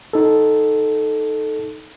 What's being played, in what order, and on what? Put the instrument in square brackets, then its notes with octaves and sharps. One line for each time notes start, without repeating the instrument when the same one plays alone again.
[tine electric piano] D#4 A4